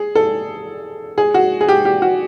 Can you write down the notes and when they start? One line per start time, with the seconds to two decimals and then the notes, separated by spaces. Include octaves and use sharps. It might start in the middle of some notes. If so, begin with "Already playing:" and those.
Already playing: G#4
0.15 A4
1.18 G#4
1.34 F#4
1.61 G#4
1.68 G4
1.85 G4
2.02 F#4